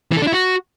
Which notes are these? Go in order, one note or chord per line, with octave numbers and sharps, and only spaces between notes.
E3
A4
D4
E4
F#4